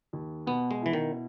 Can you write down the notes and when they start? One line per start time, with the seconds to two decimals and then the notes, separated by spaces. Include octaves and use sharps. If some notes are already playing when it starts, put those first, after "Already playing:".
0.13 D#2
0.47 B2 B3
0.71 G#3
0.82 E3 E4
0.93 D#3